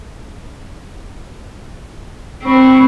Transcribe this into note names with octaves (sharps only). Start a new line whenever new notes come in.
C4 B5 C#6